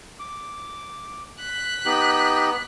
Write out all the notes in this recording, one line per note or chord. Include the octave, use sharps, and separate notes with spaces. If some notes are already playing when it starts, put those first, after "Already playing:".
D6
F#6 B6
B3 D#4 G4